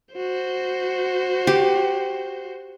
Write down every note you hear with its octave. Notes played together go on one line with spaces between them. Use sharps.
F#4 C5
G4